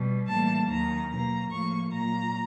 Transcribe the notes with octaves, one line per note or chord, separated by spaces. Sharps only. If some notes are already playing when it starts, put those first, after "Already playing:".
Already playing: B2 G3
A2 E3 G3 A#3 A5
D#2 D#3 F#3 A#5
B2 F#3 A#3 A#5
A2 F3 A#3 C#6
A#2 F#3 A#3 A#5